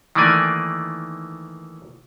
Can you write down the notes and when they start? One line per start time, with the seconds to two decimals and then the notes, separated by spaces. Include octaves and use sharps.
0.15 D#3 E3 A3 A#3 D5 G#5